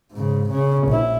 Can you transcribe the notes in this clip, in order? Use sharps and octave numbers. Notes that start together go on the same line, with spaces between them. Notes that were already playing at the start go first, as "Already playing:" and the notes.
G#2 C#3
C#3 C#4
A#1 E4